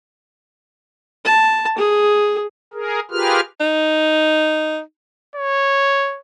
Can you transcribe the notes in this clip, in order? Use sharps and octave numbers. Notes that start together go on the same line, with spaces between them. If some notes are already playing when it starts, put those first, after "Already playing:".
A5
G#4
G#4 A#4
F4 G4 G#4 A#4 B4 F6
D#4
C#5